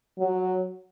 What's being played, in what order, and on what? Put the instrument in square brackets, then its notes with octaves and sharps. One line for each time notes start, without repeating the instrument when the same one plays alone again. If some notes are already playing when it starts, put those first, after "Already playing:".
[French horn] F#3